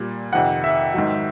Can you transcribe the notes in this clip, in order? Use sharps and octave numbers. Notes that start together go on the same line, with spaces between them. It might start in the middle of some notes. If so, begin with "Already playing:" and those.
Already playing: A#2 G3
F2 C3 D#3 F#5
E5
G#2 D#3 F#3